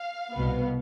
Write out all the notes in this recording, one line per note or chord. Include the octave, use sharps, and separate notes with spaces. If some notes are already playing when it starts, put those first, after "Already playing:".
Already playing: F5
C2 B2 B3